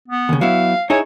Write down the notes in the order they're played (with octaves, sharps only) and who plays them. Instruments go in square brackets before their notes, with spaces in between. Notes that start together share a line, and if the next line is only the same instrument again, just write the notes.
[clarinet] B3
[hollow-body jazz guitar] D#2 C#3
[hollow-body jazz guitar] F#3 B3 E4 [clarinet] F5
[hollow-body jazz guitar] D#4 E4 G#4 [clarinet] C#5